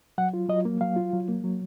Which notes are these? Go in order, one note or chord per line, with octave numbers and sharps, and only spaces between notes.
F#3 F#5
F4
F#3 D#5
A#3
F#3 F5
F4
F#3
A#3
F#3